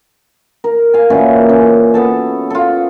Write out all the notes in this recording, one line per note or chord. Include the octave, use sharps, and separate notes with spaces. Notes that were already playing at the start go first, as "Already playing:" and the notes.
A#4
F5 G#5
A#2 E3 C#4 F#4
C#4
B3 A4 A5
F4 A4